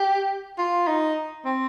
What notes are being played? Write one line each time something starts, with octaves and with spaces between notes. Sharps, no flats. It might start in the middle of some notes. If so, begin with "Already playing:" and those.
Already playing: G4
F4
D#4
C4